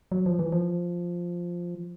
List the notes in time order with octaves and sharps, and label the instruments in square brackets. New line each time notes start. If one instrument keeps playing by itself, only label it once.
[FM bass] F#3
F3
E3
F3